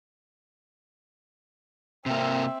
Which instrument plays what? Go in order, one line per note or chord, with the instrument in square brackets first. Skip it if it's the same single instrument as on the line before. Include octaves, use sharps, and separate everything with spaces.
[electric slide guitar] C3 A#3 [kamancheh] C4 E5